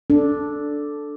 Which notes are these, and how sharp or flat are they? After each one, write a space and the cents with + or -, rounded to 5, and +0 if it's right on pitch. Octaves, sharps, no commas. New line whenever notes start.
D4 +0 A4 +0